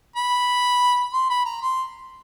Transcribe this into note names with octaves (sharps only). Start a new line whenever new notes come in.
B5
C6
B5
A#5
C6